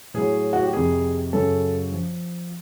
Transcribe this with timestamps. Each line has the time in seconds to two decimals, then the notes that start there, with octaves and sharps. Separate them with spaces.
0.14 A2 F#3 G#4
0.53 F#4
0.63 G4
0.73 F2 C3 D#3 G#4
1.33 F#2 C#3 F#3 A4
1.92 F3